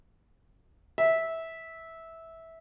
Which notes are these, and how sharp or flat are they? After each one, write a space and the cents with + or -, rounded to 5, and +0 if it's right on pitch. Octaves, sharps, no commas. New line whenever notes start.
E5 -15